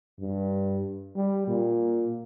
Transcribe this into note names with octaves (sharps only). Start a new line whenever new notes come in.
G2
G3
A#2